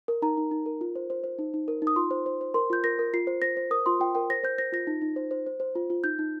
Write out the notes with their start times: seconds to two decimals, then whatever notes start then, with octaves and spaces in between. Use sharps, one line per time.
0.08 A#4
0.22 D#4 A#5
0.37 D#4
0.51 D#4
0.66 A#4
0.81 F4
0.96 C5
1.10 C5
1.24 C5
1.39 D#4
1.54 D#4
1.68 A#4
1.82 D#4
1.87 D#6
1.96 F4 C6
2.11 C5
2.26 C5
2.41 C5
2.54 A#4 C6
2.70 F4 G6
2.84 A#4 A#6
2.99 A#4
3.13 F4 C7
3.27 C5
3.42 C5 A#6
3.57 C5
3.71 A#4 D#6
3.86 F4 C6
4.00 F4 G5
4.15 A#4 G5
4.30 C5 A#6
4.44 C5 G6
4.58 C5 A#6
4.73 F4 A#6
4.87 D#4
5.02 D#4
5.16 C5
5.31 C5
5.46 C5
5.60 C5
5.75 F4
5.90 F4
6.04 D#4 G6
6.19 D#4